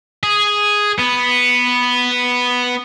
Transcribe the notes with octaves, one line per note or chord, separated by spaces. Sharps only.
G#4
B3